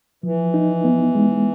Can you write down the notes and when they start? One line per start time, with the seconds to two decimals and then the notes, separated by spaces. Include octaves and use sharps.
0.23 E3 F3
0.54 D#4
0.84 B3
1.15 G#3